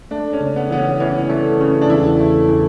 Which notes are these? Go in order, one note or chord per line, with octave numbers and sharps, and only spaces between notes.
A3 D4
C#4
C#3
B3
E3 B3
C#4
E3 C#4
A3
C#3
D4
E2 E4
A3
E3